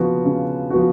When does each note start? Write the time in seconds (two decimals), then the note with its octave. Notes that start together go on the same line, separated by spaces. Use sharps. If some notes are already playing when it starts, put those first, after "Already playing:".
Already playing: C#3 F3 B3 F#4
0.25 C#3
0.70 F3 B3 F#4